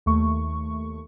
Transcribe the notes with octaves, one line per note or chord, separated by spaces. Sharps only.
D#2 A3 C#6